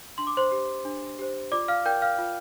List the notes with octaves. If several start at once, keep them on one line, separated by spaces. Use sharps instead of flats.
D4 C6
D6
C5 C6
G4 C5
D4
G4 C5
F4 D5 D6
F5 F6
A#4 D5 G5 G6
F5 F6
F4